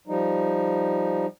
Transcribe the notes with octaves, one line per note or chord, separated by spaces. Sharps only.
F3 G3 D#4